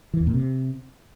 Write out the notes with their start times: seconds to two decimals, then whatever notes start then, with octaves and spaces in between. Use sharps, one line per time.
0.14 E3
0.20 E2
0.27 A#2
0.34 C3